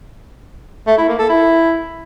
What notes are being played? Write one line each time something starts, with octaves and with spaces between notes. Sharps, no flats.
A3
E4
A#3
A4
E4